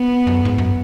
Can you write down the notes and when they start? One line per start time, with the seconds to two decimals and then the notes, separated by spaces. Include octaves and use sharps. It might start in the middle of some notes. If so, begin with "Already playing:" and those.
Already playing: B3
0.27 F#2
0.45 G#2
0.58 F#2